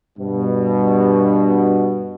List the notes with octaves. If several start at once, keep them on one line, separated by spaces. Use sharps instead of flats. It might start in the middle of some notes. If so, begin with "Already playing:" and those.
G2 B2